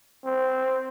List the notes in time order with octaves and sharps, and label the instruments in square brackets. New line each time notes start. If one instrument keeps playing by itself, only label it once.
[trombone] C4